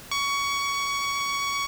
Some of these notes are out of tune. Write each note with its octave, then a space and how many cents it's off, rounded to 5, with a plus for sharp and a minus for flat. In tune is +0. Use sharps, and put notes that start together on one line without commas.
C#6 +20